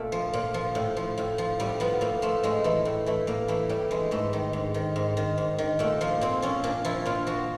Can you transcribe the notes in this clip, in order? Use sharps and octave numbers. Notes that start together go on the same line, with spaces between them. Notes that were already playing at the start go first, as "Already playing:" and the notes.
Already playing: A#2 A3
F3
A#2
F3
A2
F3
A2
F3
A2 G3
F3 B3
A2 A#3
F3 A3
A2 G#3
E3 A3
A2
E3 A3
A2 A#3
E3 A3
A2 G3
E3 G#3
G#2 A3
D#3
G#2
D#3
G#2
D#3
G#2
D#3
A#2 A3
F3 A#3
A#2 C4
F3 C#4
A#2 D4
F3 E4
A#2 F4
F3 F#4